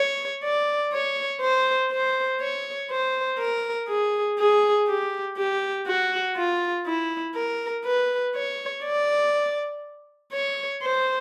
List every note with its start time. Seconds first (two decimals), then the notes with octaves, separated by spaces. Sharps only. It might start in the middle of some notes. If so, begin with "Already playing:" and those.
Already playing: C#5
0.43 D5
0.93 C#5
1.41 C5
1.91 C5
2.41 C#5
2.91 C5
3.39 A#4
3.88 G#4
4.39 G#4
4.87 G4
5.37 G4
5.87 F#4
6.37 F4
6.86 E4
7.35 A#4
7.85 B4
8.35 C#5
8.84 D5
10.33 C#5
10.82 C5